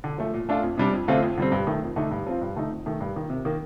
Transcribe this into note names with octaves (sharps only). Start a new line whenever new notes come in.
D3
F3 A3
A#2
A3 D4 F4
F2
C3 G3 D4
F2
D3 A3 C4 F4
F2
D3 G3 C4
G2
D#3 A3
F2
D3 A3 D#4
G2
F3 C4 F4
G2
D3 A3 D#4
F2
D#3 A3
G2
D#3 A#3
C3
D#3 A#3